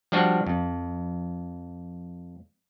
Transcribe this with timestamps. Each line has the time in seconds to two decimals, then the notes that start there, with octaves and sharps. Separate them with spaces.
0.12 F3 G3 D4 F4 F#4
0.47 F2